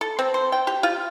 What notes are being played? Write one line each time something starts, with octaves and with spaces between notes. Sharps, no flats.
A4
C4
C5
G5
G4
F4